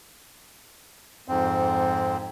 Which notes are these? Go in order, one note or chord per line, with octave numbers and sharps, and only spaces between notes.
F2 G#2 C4